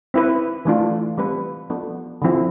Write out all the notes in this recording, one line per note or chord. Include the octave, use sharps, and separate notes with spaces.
C4 E4 B4
E3 A3 D4 F4
G3 C4 F4 B4
F3 B3 D4 A4
D3 F3 C4 E4